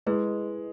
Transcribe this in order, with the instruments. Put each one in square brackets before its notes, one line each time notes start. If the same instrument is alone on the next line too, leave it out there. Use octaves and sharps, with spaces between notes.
[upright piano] G#3 [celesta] E4 G#4 B4